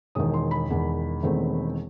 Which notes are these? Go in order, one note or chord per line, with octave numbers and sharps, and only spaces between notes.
E1 E2 D#3 D#6
C6
B5
E1 E2 D#3
E1 E2 D#3 A3 C4